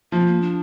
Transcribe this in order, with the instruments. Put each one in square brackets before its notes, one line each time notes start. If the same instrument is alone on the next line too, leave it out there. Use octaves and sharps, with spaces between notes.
[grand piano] F3 [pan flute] A#3
[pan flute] C4
A#3
D4